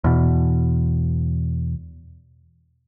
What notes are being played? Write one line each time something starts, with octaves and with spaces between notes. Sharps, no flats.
E2 B2